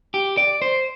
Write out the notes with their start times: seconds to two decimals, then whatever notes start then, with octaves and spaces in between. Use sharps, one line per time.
0.14 G4
0.37 D5
0.62 C5